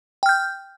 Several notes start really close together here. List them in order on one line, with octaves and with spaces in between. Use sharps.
G5 F6 G6